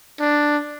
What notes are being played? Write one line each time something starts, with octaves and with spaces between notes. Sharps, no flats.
D4